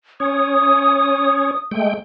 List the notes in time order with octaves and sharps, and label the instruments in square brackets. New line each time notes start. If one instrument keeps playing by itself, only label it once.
[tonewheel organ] C#4 C#5 [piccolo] D#6
[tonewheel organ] G#3 A3 G5